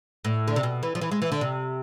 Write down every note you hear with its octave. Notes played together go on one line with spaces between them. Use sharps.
A2
D3
C3
B2
E3
F3
E3
G#3
E3
D3
C3